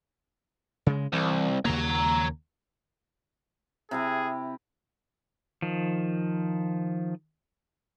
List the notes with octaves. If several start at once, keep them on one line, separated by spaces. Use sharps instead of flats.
C#3 G#3
C2 E3
D#2 C#3 A#3 C#5 A#5
C3 E4 G4 G#4
D#3 F3